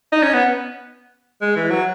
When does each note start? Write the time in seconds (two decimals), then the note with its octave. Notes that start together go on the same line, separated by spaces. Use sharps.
0.12 D#4
0.23 C#4
0.33 B3
1.42 G#3
1.56 E3
1.70 F#3